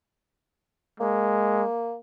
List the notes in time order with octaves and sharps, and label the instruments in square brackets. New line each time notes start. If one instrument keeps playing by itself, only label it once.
[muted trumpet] G#3 [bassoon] A#3